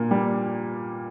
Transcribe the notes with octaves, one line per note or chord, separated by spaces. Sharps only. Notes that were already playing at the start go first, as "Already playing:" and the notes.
Already playing: A#2 A#3
G3